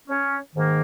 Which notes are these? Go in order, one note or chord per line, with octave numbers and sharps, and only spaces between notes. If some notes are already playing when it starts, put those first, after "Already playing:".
C#4
G#2 D#3 A#3